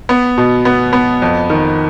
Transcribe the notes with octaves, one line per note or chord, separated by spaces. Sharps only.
B3
B2
B3
B3
F2
D#3